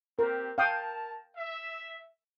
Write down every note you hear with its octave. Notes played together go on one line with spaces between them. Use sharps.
C4 G4 A#4
A#4 F5 G5 A5 D#6
E5